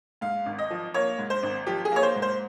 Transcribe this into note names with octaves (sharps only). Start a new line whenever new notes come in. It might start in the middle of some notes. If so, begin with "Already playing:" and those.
G#2 F5
G#1
D#5
F3
A#3 C#5
G#2
C5
G#1
F3 G4
G#4
A#3 C#5
C5
G#2
C5